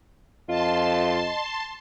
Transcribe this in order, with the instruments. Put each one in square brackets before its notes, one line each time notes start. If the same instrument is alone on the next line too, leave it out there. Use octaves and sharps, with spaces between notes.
[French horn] F2 [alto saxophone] F4 [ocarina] D#5 [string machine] A5 C6